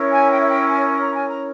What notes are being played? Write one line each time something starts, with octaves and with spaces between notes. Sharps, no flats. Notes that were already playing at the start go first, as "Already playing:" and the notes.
Already playing: C#4 E4 A#4 C#5
G#5
G5
E5
G5
G#5
G#5
A#5
G#5
A#5